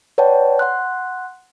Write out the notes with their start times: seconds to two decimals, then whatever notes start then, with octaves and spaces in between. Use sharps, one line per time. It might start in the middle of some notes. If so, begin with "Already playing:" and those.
0.18 B4 C#5 D5 F#5 G5 A5
0.59 F#5 C6 F#6